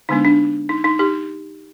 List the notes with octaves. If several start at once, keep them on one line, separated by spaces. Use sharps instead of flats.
D3 G#3 B3 D4 D#4
D4
D#4
D#4
D#4 G4